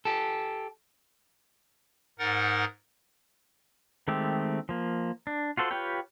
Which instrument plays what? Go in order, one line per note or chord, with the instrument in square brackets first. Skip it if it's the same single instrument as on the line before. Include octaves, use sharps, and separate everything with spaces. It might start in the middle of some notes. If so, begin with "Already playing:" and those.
[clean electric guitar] G4 A4
[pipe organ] G#2 D#4 A#4 F#5 A6
[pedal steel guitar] D#3 G#3 A3 C4 G4
F3 A#3
D4
F4 F#4 A4 C5
F4 G4 B4 C#5 G5